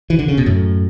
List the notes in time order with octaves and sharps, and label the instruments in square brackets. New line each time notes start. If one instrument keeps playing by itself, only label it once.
[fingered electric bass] E3
D3
C#3
B2
F#2 A2